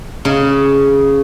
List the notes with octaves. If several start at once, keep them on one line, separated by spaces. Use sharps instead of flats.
C#3